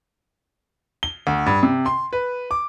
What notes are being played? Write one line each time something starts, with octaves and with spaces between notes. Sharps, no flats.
G7
D2
G2
C3
C6
B4
D6